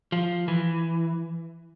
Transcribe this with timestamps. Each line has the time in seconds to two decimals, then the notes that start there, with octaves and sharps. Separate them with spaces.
0.12 F3
0.48 E3